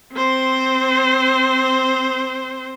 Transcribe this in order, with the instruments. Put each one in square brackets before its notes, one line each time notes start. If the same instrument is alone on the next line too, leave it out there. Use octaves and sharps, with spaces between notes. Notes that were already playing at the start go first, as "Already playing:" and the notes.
[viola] C4 C5